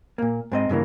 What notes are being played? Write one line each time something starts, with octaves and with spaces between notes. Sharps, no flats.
A#2 A#3
G#2 C4 D#5
G2 C#3 E3 A#3